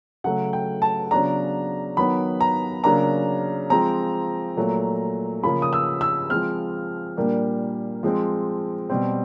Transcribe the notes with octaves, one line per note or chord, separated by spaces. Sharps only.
C#3 F#3 A3 F#5
G5
A5
C#3 F#3 B3 D4 A#5
D#3 F#3 B3 B5
A#5
C#3 F#3 A#3 D4 A#5
F3 G#3 C4 A#5
A#2 F#3 A3
C#3 F3 A#3 B5
D#6
E6
E6
F3 G#3 C4 F6
A#2 G3 A#3 D4
F3 G#3 C4
B2 G3 C4